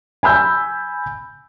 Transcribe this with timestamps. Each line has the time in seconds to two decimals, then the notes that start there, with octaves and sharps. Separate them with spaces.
0.23 G#5 B5 E6 G6